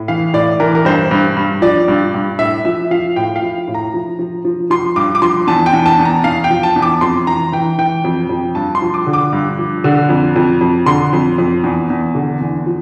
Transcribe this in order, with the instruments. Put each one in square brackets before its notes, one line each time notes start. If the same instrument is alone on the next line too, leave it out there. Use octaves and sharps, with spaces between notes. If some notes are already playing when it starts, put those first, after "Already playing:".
Already playing: [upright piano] A2
E3 F5
A2 D5
E3 A#4
A#4
G2 C5
G2
G2
F3 D5
G2
G2
A2 E5
F3 E5
F3 F5
A2 G5
F5
F3
A2
A#5
F3
F3
F3
F3 C6
G2 D6
D6
F3 C6
E2 A5
G5
E2
A5
E2
A#5
E2 F5
G5
F3
A5
E2
D6
F2 C6
E3 A#5
E3 G5
E3 G5
F2
F2
G2 A5
C6
F3
D6
D3
D6
G2
F3
D3
F2
F2
F2
D3 C6
F2
F2
E2
E2
D3
E2
F3